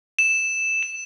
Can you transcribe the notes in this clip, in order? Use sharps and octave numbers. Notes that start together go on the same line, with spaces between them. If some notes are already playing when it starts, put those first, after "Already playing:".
E7
E7